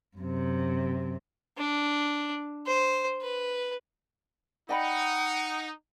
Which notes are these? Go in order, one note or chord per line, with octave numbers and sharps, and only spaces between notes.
F#2 C3
D4
C5
B4
D#4 D5 F#5 G5 B5